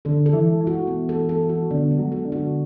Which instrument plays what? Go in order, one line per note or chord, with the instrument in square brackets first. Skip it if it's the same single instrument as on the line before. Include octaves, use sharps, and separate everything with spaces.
[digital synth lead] D3 [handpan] A4
[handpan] A4
[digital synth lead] E3
[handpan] G#3
[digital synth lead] E3
[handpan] F#4
B3
A4
A4
F#4
[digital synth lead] D3 [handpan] B3
[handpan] G#3
[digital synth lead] F#3
[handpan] A4
[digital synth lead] D3
[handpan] F#4